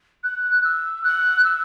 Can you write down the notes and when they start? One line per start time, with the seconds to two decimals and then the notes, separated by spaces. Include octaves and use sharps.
0.24 F#6
0.64 E6
1.04 F#6
1.44 E6